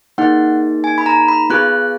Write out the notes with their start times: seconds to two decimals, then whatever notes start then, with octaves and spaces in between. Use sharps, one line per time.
0.18 A#3 D#4 G#4 F#5
0.84 G#5
0.98 B5
1.06 A#5
1.28 B5
1.50 B3 F4 G#4 F#6